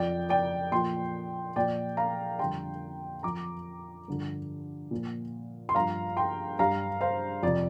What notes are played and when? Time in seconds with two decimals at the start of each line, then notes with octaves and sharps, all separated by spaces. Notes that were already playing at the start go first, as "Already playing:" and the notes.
Already playing: F2 F3 D5 G5
0.29 D5 G5
0.72 A#2 F3 G5 C6
1.56 A#2 F3 D5 G5
1.97 F5 A#5
2.39 F2 D3 G3 G5 C6
3.23 F2 F3 A#5 D6
4.08 G2 D3 F3
4.91 A#2 F3
5.69 C6
5.75 G2 F3 F5 A#5
6.17 G5 C6
6.59 G2 G3 F5 A#5
7.01 C5 F5
7.43 F2 C3 F3 D5